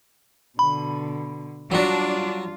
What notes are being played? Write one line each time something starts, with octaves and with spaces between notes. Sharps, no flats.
B2 D3 B5
F#3 G3 D4 F4 F#4